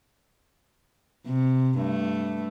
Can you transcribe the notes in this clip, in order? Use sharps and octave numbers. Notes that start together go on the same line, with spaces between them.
C3
G2 A3